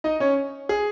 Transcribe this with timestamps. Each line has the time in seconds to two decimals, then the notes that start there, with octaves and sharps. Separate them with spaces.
0.04 D#4 D#5
0.20 C#4 C#5
0.69 G#4